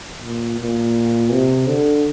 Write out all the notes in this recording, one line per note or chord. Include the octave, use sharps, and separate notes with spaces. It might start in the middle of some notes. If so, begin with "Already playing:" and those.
A#2
A#2
C3
D3